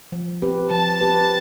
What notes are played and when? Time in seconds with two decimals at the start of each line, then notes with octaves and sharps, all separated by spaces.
0.12 F3
0.42 C4 G4 B4
0.70 F3 A5
1.01 C4 G4 B4